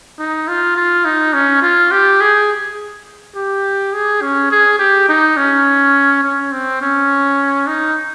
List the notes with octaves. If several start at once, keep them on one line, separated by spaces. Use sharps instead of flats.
D#4
F4
F4
D#4
C#4
F4
G4
G#4
G4
G#4
C#4
G#4
G4
D#4
C#4
C#4
C4
C#4
D#4